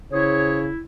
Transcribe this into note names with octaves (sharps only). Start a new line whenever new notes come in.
C#3 E4 G#4 C5 C#5